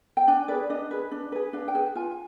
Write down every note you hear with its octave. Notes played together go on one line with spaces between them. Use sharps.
G5
D4 G#5
G#4 B4 D5
D4 D#5
G#4 B4
D4
G#4 B4
D4 F5
G5
G#4 B4
F4 G#5